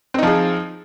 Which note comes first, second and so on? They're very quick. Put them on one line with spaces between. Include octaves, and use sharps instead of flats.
C4 D#4 F3 G#4